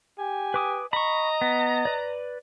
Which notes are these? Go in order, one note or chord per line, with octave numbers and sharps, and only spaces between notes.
G4 G#5
B4 D6 D#6
D#5 A#5 B5 C#6
B3
B4 D5